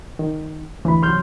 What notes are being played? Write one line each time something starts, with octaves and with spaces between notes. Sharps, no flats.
D#3
D2 E3 B5
C2 F#3 C6 F6 G6